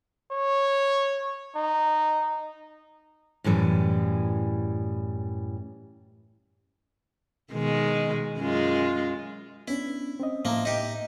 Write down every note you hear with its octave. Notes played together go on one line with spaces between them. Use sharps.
C#5
D#4
F#2 A2 E3 G3
B2 D#3 G#3
F#2 G#3 F4
B3 C#4 D4 E4
C4 C#4 D#5
A2 F3 A#3 E5 A#5
D#4 G4